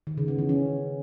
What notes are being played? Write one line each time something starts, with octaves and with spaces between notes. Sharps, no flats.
D#3
C#3
B3
E3
C#4